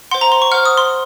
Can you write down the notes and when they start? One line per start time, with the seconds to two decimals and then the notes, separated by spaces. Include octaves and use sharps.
0.11 C5 F#5 C6
0.21 A#5
0.32 C6
0.42 C#6
0.51 C5 F#5 F6
0.66 D#6
0.78 C6